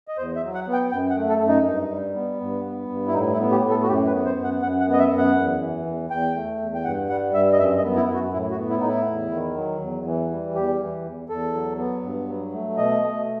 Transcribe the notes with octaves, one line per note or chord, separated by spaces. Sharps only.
D#5
E2 C5
E5
F#3
F#5
B3
G5
F#2 G5
F#5
A3
A4
F#2
D#4
G2
G3
B3
G2
B3
G2
E4
A2 D#4
E4
B3
G4
A2
A4
F#4
F#2 G4
B4
B3
C5
F#2
F#5
F#2 F#5
F#5
B3
D#5
E5
F#2
F#5
E2
E3
E2
E2 G5
A3
E2
G5
G2 F#5
G3 F#5
G2 E5
D#5
F#2 E5
D#5
B3
E4
F#2
F#4
A2 E4
F#4
B3
E4
A2 D#4
E4
E2
D#3
F#3
E2
E3
G3
E2 G4
E3
E2
E2 A4
F#3
B3
G2
F#3
A3
B2 D#5
A3